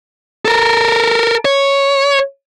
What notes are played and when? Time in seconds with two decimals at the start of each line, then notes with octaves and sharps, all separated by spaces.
0.45 A4 A#4
1.45 C#5